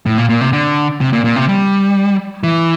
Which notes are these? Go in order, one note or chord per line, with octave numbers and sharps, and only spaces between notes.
A2
A#2
A#2
C3
D3
C3
A#2
A#2
C3
G3
E3